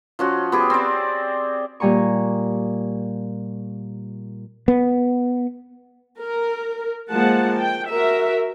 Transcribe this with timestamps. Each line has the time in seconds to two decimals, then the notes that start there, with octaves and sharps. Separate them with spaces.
0.19 F3 C#4 F#4
0.52 B3 G4 G#4
0.70 C4 D5
1.80 A#2 G3 G#5 A#5 C#6
4.68 B3
6.22 A#4
7.09 F3 G#3 A#3 F#5 A5
7.59 G5
7.88 F#4 A#4 E5